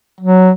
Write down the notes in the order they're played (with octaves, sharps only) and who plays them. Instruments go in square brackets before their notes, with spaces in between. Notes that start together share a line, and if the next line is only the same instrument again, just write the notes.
[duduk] F#3